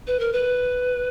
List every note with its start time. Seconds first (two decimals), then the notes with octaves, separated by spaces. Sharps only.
0.07 B4
0.19 A#4
0.33 B4